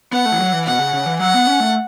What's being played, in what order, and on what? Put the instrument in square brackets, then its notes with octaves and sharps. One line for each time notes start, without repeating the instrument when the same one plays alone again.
[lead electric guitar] B3 [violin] F#5
[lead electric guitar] A3
E3
F#3
E3
[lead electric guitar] B2 [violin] F#5
[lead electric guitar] C#3
C#3
E3
[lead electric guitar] F#3 [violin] F#5
[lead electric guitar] B3
C#4
A3